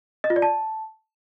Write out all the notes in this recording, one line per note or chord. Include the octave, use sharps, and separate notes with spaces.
D#5
F4
D5
A5